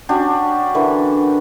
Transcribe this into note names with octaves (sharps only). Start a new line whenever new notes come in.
C#4 D4 F#4 G4
D3 E3 A#4